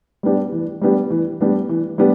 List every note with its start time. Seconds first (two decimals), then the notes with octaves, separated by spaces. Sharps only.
0.23 G3 B3 D4 G4
0.52 E3
0.82 G3 B3 D4 G4
1.10 E3
1.41 G3 B3 D4 G4
1.69 E3
1.98 G3 B3 D4 G4